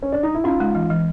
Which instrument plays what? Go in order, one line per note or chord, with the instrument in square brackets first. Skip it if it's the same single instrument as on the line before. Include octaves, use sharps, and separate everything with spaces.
[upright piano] C#4
D4
D#4
E4
[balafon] C#4 [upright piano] D#4 F4
[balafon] G#3
E3
E3